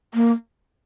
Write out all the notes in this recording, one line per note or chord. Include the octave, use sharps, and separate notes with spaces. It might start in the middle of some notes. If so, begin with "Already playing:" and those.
A#3